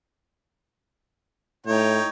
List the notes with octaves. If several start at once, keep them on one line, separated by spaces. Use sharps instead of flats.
A2 D#4 C#5 G5